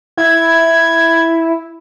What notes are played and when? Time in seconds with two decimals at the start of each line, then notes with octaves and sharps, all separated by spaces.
0.17 E4 G#6